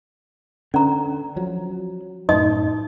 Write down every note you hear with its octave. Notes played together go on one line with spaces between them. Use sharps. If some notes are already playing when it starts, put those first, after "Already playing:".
D3 C#4 A#5
F3 F#3
F#2 A2 D#4 D#5 D#6